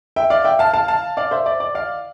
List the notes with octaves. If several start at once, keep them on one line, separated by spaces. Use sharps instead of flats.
E5 G5
D5 F5
E5 G5
F5 A5
F5 A5
F5 A5
D5 F5
C5 E5
D5
D5
D5 F5